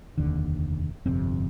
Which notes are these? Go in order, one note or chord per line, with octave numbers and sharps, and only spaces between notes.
F1 D#2 D3
G1 F2 C3 C4